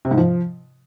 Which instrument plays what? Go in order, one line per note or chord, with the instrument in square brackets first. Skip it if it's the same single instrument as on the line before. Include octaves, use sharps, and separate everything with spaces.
[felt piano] C3
G#2
F3